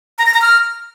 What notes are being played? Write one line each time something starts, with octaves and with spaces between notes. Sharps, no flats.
A#5
A#6
A#5
F6